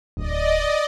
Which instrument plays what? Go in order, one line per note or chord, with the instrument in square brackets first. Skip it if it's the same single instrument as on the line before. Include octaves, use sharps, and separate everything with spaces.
[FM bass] D1 [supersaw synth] D5 D#5